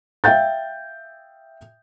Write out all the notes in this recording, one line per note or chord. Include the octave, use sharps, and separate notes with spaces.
E5 F5 G5 G6 A6